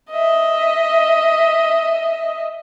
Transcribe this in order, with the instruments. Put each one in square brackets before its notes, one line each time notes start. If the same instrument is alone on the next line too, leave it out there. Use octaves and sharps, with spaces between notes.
[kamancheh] D#5 E5